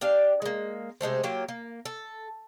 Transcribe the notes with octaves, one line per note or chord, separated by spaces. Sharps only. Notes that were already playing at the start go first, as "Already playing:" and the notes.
D4 G4 F5
G#3 A#3
C3 G#3 A3 C5
F#3 A#3 F4 G4
A#3
A4